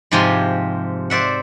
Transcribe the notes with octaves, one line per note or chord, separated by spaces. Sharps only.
G#2 C3 F3 G4 G#5 C6
C5 D5 E5 F#5